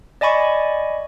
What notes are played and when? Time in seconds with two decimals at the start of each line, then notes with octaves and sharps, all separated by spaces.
0.21 D5 D#5 G#5 B5 C#6